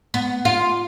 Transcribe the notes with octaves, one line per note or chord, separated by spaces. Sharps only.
B3
F4